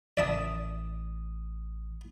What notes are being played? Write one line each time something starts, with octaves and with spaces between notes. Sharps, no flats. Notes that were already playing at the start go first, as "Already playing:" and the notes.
A1 D5 E5 A5 D#6